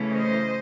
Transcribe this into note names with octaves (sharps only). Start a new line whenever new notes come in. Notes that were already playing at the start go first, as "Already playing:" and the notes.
Already playing: C#3 E3 A3 C#4
C5 D#5